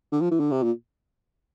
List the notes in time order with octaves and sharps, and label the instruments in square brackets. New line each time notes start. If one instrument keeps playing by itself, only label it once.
[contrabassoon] D3
F3
E3
D3
C3
A#2